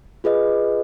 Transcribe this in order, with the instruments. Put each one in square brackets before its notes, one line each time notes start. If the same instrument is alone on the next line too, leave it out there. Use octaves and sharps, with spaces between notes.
[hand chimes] F4 G#4 B4 D#5